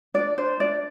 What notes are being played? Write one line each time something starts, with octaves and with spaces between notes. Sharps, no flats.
D4 D5
D4 C5
D4 D5